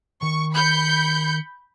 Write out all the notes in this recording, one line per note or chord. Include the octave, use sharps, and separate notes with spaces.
D#3 C#6
B5 G6 C#7